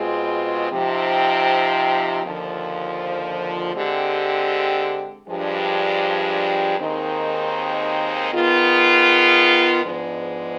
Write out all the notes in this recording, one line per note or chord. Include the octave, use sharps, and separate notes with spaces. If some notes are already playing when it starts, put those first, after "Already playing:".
Already playing: B2 G#3 C4 F4 G#4
C3 F3 C4 D#4 G4
D#2 D3 F3
D3 G#3 C4 G4
G2 F3 G#3 D4 G4
D#2 D#3 G#3 C4 D#4
D#3 B3 F4 G#4
G#2 F3 G#3 B3 D4